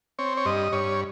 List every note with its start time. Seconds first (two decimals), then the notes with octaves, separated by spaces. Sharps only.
0.19 C4 C#5
0.37 C#5
0.45 G2 D#5
0.72 G2 C#5